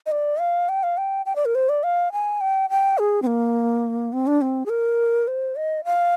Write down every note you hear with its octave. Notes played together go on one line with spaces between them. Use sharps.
D#5
D5
F5
G5
F5
G5
G5
D5
A#4
C5
D5
F5
G#5
G5
G5
G#4
C4
A#3
C4
D4
C4
G#4
A#4
C5
D#5
F5